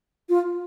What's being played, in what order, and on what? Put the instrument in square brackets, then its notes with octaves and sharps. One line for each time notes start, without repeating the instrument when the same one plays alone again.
[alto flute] F4